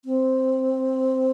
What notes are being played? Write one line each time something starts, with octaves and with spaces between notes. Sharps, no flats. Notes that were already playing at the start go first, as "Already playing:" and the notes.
C4